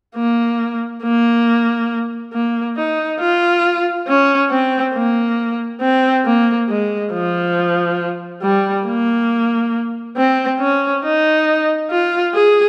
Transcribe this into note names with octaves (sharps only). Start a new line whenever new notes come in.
A#3
A#3
A#3
D#4
F4
C#4
C4
A#3
C4
A#3
G#3
F3
G3
A#3
C4
C#4
D#4
F4
G#4